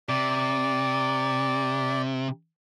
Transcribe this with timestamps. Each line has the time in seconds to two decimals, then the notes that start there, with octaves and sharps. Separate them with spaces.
0.09 C3 D5